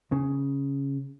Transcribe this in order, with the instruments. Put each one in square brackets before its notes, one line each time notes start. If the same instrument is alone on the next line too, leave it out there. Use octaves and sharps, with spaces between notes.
[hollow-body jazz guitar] C#3